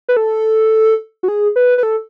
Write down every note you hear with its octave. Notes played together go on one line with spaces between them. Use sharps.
B4
A4
F#4
G#4
B4
B4
A4